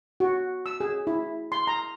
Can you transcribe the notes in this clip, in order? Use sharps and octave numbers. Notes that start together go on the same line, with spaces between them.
F#4
E6
G#4
E4
C6
A#5